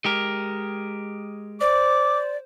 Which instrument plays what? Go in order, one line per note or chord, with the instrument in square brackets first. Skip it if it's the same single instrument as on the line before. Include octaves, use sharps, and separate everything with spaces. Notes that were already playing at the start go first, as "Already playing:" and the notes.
[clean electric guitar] G#3 G4 A#4
[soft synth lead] C5 [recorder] D5 [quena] D6